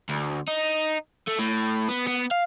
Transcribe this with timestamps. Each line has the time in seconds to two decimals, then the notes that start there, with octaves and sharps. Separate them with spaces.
0.09 D2
0.48 D#4
1.28 A3
1.39 A2
1.89 B3
2.07 B3
2.31 F5